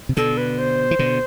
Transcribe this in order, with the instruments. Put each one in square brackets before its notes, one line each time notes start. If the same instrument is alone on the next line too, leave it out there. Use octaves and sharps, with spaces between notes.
[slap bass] C3
[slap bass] B2 D3 [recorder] A4
[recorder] B4
C5
[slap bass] E3
B2 D3